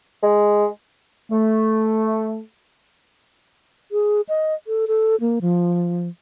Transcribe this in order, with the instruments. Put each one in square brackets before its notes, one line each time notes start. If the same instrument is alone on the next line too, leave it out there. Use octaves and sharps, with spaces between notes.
[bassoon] G#3
[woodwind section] A3
[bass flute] G#4
D#5
A4
A4
A#3
F3